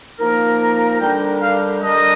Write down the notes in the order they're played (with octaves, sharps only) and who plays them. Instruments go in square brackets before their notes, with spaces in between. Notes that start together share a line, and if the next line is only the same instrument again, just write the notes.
[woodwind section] F3 A#3 D#4 A#4
[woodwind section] D3 G3 D4 G4 A#4 [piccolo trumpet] G5
[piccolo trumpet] F5
[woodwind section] D3 G3 D4 G4 A#4 [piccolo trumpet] D#5